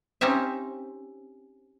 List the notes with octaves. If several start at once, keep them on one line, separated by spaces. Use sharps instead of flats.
C4 C#4 D#4 G4 E5